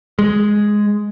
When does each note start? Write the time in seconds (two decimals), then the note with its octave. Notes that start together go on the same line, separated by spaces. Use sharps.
0.19 G#3